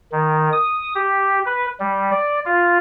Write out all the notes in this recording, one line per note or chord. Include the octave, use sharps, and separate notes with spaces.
D#3
D#6
G4
B4
G3
D5
F4